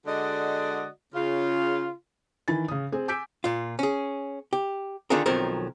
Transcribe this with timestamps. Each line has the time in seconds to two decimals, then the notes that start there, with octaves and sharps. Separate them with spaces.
0.07 D3 G#3 F#4 D5 D#5
1.15 C#3 F4
2.48 D#3 E3 G#5 B5 A6
2.68 C#3 D#6
2.92 C4 G#4
3.08 G#5 D6 E6 G6 B6 D7
3.44 A#2 F4
3.79 C#4 G#4
4.53 G4
5.10 D3 D#3 D4 F4 G#4 A#4
5.26 B1 D#3 F3 F#3 C4 A#4